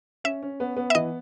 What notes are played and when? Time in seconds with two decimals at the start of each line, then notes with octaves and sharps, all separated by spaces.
0.24 C#4 E5
0.43 C#4
0.60 B3
0.77 B3
0.90 E5
0.95 E3 D#5